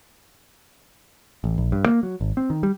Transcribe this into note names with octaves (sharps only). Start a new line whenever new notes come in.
A1
A#1
G2
A#3
F#3
G#1
C4
D#3
G3